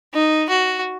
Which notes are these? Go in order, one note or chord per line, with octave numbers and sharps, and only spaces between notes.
D#4
F#4